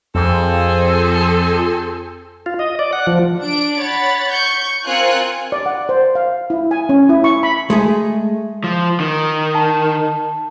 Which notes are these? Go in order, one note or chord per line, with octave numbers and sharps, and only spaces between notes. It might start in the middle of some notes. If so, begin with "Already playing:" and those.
F2 C4 G#4 A4
F4
D#5
D5
F#5
F3
D4 D7
C#5 F#5 B5 A6
C#6 G6
C4 F4 A#4 G#5 F#6 C#7
D5
F#5
C5
F5
E4
G#5
C#4
E4
C#6
B5
G#3 A3 G#4
F3
D#3
A5